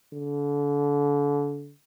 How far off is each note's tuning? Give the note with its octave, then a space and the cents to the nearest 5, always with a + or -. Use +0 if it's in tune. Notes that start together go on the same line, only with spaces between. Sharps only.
D3 -35